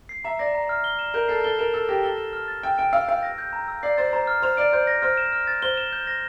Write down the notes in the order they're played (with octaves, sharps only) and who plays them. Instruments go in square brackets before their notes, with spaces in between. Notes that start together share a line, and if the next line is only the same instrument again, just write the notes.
[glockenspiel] C7
[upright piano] E5 [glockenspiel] A#5
[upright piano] D5 [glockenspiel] A#6
[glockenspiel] A#5
F6
G7
E7
[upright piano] A#4 [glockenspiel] G6
[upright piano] A4 [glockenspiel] C7
[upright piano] A4 [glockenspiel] G7
[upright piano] A#4 [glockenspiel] E7
[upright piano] A4 [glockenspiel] E6
[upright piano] G4 [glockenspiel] A#6
[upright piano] A4 [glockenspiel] G7
[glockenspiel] E7
F6
A6
[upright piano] G5 [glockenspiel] E6
[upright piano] G5 [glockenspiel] D7
[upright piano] F5 [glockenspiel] E6
[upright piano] F5 [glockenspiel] G6
[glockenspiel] A#6
G6
A#5
E6
[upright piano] D5 [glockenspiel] C7
[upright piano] C5 [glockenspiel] A6
[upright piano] C5 [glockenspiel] A#5
[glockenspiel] F6
[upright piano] C5 [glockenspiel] F7
[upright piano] D5 [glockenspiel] D7
[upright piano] C5 [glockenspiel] G6
[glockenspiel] A#6
[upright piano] C5 [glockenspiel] F6
[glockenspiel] E7
F6
A6
[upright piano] C5 [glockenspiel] G7
[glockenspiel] E7
G6
A#6